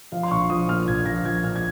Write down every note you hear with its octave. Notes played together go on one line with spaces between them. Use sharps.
F3 F5
C6
A#1 C#6
F3 D#6
A#2 F6
A#1 G#6
F3 A#6
F3 G#6
A#1 F6
G#6